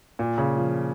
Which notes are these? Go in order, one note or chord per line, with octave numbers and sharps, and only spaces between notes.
A#2
C#3
F3